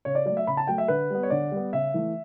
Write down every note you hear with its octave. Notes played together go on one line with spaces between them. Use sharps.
C#3 C#5
D5
F#3 A3 D5
E5
C#3 B5
A5
F#3 A3 G5
E5
D3 B4
G3 B3
C#5
D3 D5
G3 B3
C#3 E5
E3 A3